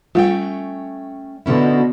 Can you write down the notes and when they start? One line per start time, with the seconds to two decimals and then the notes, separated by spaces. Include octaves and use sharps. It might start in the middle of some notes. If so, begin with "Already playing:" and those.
0.15 G3 A3 C#4 F4 G5
1.46 B2 D3 C#4 E4